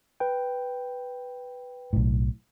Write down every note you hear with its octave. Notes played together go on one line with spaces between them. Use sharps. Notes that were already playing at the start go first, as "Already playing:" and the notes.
B4 G5
B1 A2